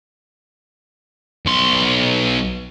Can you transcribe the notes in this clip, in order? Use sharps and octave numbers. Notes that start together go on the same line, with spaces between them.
B1 C6